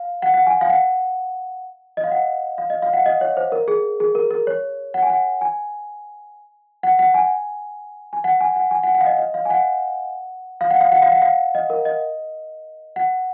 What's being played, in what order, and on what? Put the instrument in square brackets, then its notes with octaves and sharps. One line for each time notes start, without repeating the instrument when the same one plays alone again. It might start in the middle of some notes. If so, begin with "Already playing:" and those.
Already playing: [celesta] F5
F#5
F#5
G#5
F5
F#5
D#5
F5
F#5
F5
D#5
F5
F#5
D#5
C#5
C5
A#4
G#4
G#4
A#4
A#4
C#5
F#5
G#5
F#5
G#5
F#5
F#5
G#5
G#5
F#5
G#5
F#5
G#5
F#5
F#5
F5
D#5
D#5
F5
G#5
F#5
F5
F#5
F5
F#5
F5
F#5
F5
D#5
A#4
D#5
F#5